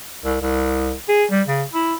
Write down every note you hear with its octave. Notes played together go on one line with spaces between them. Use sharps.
C2
C2
G#4
G3
C#3
E4